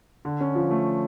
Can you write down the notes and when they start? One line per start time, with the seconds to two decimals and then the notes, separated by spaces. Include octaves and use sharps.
0.25 D3
0.40 C#4
0.55 F3
0.71 A3